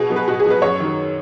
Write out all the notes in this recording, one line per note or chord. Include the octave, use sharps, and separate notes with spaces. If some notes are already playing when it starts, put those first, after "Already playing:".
Already playing: B2 G#4
F#3 B3
B4
B2 F#4
G#4
F#3 B3 B4
F#2 C#5
D#3 F#3